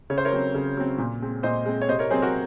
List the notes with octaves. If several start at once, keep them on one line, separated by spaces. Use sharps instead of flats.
C#3 C#5
C5
A#4 C#5
F#3 C4
C#3
F#3 C4
A#2
G#3 C4
A#2 C5 D#5
G#3 C4
C#5
C3 C5 D#5
A#4 C#5
F#3 C4 G#4 C5
F#4 A#4